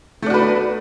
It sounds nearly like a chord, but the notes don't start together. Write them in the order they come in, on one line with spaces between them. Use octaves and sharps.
A3 D4 F#4 B4 B3